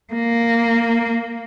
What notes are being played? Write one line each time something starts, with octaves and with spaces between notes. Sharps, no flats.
A#3